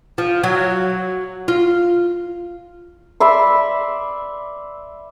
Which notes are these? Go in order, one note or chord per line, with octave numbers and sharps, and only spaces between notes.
F3
F#3
F4
D5 E5 B5 C6